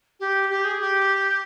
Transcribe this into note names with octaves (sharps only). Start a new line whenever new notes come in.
G4
G4
G#4
G4